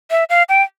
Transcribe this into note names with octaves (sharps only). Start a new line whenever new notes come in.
E5
F5
G5